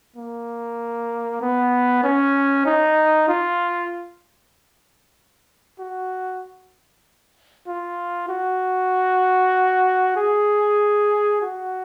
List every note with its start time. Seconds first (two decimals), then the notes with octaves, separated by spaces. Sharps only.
0.16 A#3
1.42 B3
2.04 C#4
2.66 D#4
3.28 F4
5.79 F#4
7.67 F4
8.29 F#4
10.16 G#4
11.42 F#4